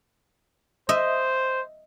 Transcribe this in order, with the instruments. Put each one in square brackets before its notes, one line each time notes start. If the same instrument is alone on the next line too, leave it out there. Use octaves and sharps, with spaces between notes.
[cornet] C5 [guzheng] D#5 E5